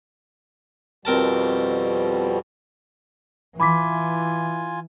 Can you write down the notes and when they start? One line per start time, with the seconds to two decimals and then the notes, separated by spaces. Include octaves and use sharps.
1.05 F2 B2 G3 C4 A#4 A5
3.60 E3 F4 G#5 B5 D6 B6